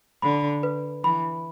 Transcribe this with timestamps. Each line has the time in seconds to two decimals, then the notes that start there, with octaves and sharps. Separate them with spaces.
0.22 D3 B5
0.63 B4
1.04 E3 B5